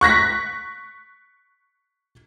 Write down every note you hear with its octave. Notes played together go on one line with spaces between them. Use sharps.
C#6 F#6 A#6 B6